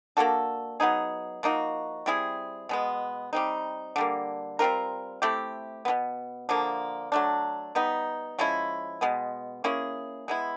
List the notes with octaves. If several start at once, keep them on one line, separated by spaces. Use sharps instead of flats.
A#3 D4 F#4 A4
F#3 B3 D#4 G#4
F3 A#3 D#4 F#4
G3 C4 E4 G#4
B2 G#3 B3
G3 C4 D#4
D3 G3 A#3
G3 C4 F4 A#4
A3 C4 E4 G4
B2 F#3 B3
D3 F3 A#3
F#3 A3 D4
G3 B3 D#4
F3 G#3 C#4 E4
B2 G#3 B3
A#3 C#4 E4 G#4
G#3 B3 E4